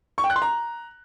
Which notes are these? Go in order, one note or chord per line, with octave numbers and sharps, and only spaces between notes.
C#6
G5
F#6
C6
A#5